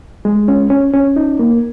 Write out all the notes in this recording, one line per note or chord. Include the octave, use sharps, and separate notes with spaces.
G#3
C#4
C#4
C#4
D#4
A#3